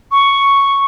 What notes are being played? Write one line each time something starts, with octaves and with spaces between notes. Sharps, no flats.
C#6